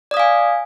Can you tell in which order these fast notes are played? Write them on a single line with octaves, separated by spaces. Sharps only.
D5 D#6 F5 G#5